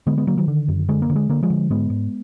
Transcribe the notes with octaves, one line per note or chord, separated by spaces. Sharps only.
D3 G#3 B3
G#3 B3
D3 F#3 A#3
D#3 F#3
D3
F#2
D3 G#3
A#3
D3
G#3
D3 A#3
F3 G#3
D3
G#2 G#3 B3
G#2